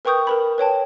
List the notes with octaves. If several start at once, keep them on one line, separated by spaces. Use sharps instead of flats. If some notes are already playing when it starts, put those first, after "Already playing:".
A#4 B4 G5 C#6 D#6 G6
A#4 B4 B5
B4 C#5 G5 A5